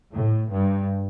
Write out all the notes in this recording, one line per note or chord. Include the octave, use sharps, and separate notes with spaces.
A2
G2